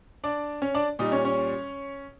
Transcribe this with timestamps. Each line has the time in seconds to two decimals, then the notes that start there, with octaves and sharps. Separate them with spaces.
0.24 D4 D5
0.62 C#4 C#5
0.75 D4 D5
0.99 A#2 G3 D#4 D#5
1.12 C#4 C#5
1.25 C#4 C#5